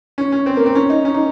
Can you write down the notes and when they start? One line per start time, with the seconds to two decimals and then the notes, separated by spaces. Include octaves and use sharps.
0.18 C#4
0.32 C#4
0.46 C4
0.56 A#3
0.66 C4
0.75 C#4
0.90 D#4
1.05 C#4
1.14 D#4